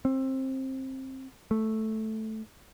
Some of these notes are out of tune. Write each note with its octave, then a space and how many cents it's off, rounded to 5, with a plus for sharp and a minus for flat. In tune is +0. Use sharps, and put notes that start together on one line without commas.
C4 +20
A3 -5